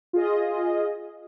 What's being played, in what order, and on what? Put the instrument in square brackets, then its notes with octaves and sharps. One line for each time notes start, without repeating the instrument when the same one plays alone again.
[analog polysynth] F4 G#4 D#5